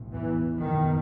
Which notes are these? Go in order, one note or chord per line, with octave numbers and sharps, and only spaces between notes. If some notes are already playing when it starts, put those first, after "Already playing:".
Already playing: B1 A2
E2 E3
F#1 E2 B2 D#3